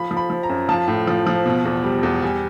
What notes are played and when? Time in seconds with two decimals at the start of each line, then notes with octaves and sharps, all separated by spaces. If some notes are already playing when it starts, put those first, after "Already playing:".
Already playing: F3 B5
0.11 F3
0.17 B5
0.30 F3
0.43 A#5
0.49 F#2
0.69 F3 A5
0.87 A2
1.07 F3
1.27 F3
1.46 B2
1.65 E2
1.84 G3
2.03 E2
2.22 G3 G#5